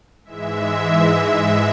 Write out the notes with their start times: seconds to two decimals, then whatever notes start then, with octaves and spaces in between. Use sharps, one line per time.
0.25 G#2 E3 G#3 E5